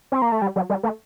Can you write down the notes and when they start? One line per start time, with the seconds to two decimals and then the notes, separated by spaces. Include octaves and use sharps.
0.12 C4
0.22 A#3
0.32 A3
0.42 G3
0.56 F#3
0.70 G3
0.83 A3